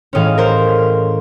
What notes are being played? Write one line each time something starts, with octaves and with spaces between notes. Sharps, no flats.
A2 E3 G#3 C#4 D#5 F5
A#4 C5